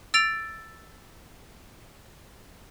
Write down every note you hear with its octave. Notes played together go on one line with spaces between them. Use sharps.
E6 A6 D7 F7